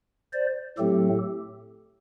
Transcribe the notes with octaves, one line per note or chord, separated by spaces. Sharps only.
C5 D5
A2 F#3 A3 C4 G4 A4